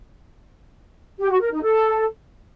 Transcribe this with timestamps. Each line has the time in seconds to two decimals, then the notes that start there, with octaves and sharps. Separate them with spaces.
1.19 G4
1.30 F#4
1.41 A#4
1.51 D#4
1.62 A4